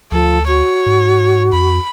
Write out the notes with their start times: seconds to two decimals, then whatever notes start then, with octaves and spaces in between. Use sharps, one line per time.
0.12 D2 F3 A4
0.47 F#4 C#5
0.86 G#2
1.53 F2 B5